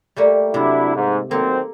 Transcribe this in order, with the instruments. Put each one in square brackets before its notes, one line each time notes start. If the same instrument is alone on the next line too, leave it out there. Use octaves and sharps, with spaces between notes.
[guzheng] G3 A3 A#3
[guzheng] C3 [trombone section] F#3 D4 E4
[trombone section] G#2
[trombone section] D#3 F#3 C4 [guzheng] A#3 A4